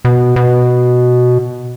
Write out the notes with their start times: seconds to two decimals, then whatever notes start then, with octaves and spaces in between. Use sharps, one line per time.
0.05 B2
0.36 B2